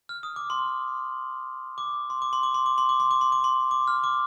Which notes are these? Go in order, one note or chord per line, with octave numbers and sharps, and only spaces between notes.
F6
D#6
D6
C6
D6
C6
D6
C6
D6
C6
D6
C6
D6
C6
D6
C6
D6
C6
D6
F6
D6